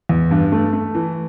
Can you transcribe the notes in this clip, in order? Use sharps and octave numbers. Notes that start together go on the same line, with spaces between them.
E2
G2
A3
A3
E3